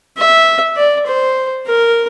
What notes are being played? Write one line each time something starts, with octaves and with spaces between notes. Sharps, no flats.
E5
D5
C5
A#4